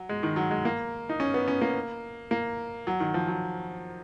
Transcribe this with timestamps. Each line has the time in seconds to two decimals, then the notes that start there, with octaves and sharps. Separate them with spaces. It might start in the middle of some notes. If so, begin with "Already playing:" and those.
Already playing: F#3
0.09 G#3
0.23 D#3
0.36 F#3
0.51 G#3
0.65 A#3
1.09 D#4
1.20 C#4
1.34 B3
1.48 C#4
1.61 A#3
2.31 A#3
2.87 F#3
3.00 D#3
3.14 F3
3.28 F#3